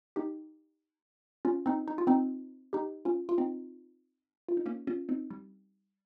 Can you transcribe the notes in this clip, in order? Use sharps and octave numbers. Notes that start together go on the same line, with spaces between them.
D#4 G4
C#4 F4
C4 D#4
D#4
F4
C4 D#4
D#4 G4
C#4 F4
F4
C4 D#4
F4
D#4
A#3 C#4
C#4 F4
C4 D#4
G3